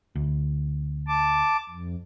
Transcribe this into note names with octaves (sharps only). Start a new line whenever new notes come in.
D2
A5 D6
F2